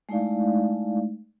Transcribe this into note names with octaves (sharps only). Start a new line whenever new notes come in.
G#3 A3 D#4 E4 D5 F5